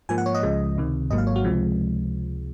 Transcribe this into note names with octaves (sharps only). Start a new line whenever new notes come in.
G#2 F3 A#3 G#5
F#5
C#5
D#5
C#2 C#3 F3 G#3
C#2 C3 D#3
G#1 G#2 F#3 A#3 D#5
F5
C#5
F#4
C#2 C3 F3 G#3